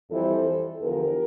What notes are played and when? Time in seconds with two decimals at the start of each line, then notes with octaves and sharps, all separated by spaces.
0.10 F2 E3 G3 A4 C5
0.81 E2 D3 F3 G4 A#4